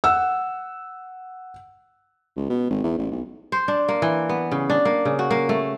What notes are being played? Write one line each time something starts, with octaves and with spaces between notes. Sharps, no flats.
F#5 E6
C#2
B2
G#1
E2
A1
B1
C5
D4
A#3
E3
B3
C#3
D4
A#3
C#3
F#4
A#3
A3